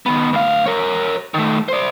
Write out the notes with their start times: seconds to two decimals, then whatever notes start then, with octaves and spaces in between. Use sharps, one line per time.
0.06 D#3 B3
0.33 D2 F5
0.66 A#4 C#5
1.34 D#3 A3
1.68 C5 D5